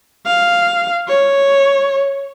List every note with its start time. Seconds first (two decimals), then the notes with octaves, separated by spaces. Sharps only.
0.26 F5
1.08 C#5